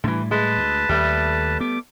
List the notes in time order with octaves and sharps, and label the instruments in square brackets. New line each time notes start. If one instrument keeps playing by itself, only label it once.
[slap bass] A2 G3 [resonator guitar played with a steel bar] D3 E3
[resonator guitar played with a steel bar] G#3 [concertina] B4 A5
[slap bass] D2
[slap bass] D#2 [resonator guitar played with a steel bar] G3 A3
[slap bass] B3 [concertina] D6